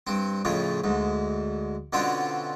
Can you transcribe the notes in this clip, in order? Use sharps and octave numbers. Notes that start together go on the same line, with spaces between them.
G2 C4
F2 A2 C#3 F4
D2 G#2
B2 D3 C4 C#4 F4